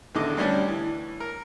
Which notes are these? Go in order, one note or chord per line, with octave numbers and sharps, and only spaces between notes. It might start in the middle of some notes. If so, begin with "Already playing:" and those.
A1 E2 D3 D#3 D#5 D6
D2 G3 C#4 D4
E3
A#4